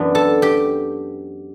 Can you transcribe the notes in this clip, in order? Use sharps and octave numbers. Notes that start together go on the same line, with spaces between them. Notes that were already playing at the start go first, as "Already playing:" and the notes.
Already playing: F#2 E3 B3 D4
A4 A5
G4 G5